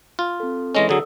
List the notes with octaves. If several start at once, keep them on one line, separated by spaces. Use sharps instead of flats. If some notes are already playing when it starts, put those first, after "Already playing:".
F4
C4 A4
E3 G#3 C#4 A4 D#5
D3 F#3 G#4 D5 D#6 E6